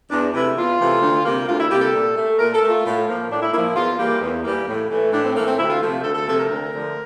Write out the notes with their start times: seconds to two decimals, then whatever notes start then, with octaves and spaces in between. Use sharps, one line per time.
0.11 E2 D4
0.33 C3 E3 A3 E4
0.57 E2 F4
0.80 C3 E3 A3
1.02 D2
1.25 C3 G3 A#3
1.48 D2 F4
1.59 E4
1.71 C3 G3 A#3 G4
1.82 A4
1.94 A#2
2.16 A3
2.39 A#2 A#4
2.54 A4
2.62 A3
2.69 F4
2.85 A2
3.08 F3 A#3
3.30 A2 D4
3.41 E4
3.53 A#3 E4
3.57 F3
3.76 E2 F4
3.99 E3 G3 A#3
4.22 E2
4.44 E3 G3 A#3
4.67 A2
4.91 E3 A3
5.12 A2 D4
5.25 C4
5.36 A3 A#3
5.40 E3
5.47 C4
5.58 D2 E4
5.70 F4
5.82 C3 F3 A3
6.04 D2 A4
6.15 A4
6.26 C3 F3 A3 A4
6.39 A#4
6.49 D2
6.73 D3 F3 A3